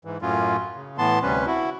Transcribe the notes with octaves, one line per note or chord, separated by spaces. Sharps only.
G#2 E3
F#2 A2 F#3 C#4 F4
C#3
A2 E3 B3 A5 C6
D2 C3 G3 C#4 B4
E4 F#4